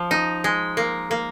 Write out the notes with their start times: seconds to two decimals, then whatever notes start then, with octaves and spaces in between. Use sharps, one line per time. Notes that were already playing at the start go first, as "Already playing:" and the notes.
Already playing: F3
0.11 D#4
0.44 G#3
0.77 A#3
1.11 A#3